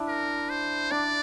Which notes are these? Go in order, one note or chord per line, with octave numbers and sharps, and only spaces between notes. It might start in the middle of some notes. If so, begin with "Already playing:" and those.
Already playing: D4 E4
A#4
C5
D4 D5